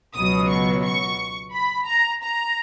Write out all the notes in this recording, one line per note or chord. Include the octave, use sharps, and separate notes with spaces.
C#2 B2 F#3 D#6
C#6
C#6
B5
A#5
A#5